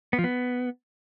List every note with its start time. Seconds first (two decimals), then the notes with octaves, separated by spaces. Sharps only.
0.13 B3
0.18 F3
0.24 B3